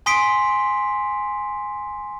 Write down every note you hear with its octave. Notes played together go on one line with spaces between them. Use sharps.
G#5 C6 D#6 B6 C7 D7